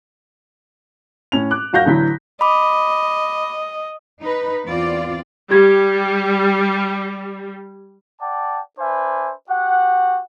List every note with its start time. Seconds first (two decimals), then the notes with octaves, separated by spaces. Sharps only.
1.32 A2 C#4 F7
1.51 D6 F#6
1.73 E1 F#4 F5 G6 A#6
1.86 A1 D3 E3 F#3 B6
2.41 D#5 B5 D6
4.21 D#4 B4
4.66 E2 C4 F4 D5
5.51 G3 G4 G#6
8.21 D5 F#5 G5 A5
8.79 D4 B4 C5 E5 G#5
9.50 F#4 G4 F#5